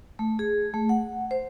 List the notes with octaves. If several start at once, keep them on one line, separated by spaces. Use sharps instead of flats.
A3
G#4
A3
F#5
C5